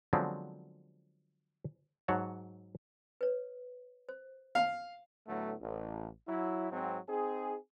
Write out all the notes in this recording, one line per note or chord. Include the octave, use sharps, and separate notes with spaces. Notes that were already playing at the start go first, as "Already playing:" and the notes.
D3 F3 F#3 G#3 B3 C4
G#2 F#3 C#5 F#5 A5
B4 C#5
C5
F5
A2 D3 F#3 A3 B3
A1
F#3 E4
G#2 F#3 C4
C4 D#4 G#4